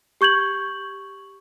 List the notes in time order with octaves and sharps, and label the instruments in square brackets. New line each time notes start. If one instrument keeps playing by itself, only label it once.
[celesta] G4 C#6 G6 G#6 F#7